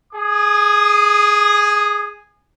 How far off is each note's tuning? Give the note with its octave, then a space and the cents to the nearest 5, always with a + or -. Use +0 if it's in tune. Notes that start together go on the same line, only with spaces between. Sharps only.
G#4 +0 D#6 -30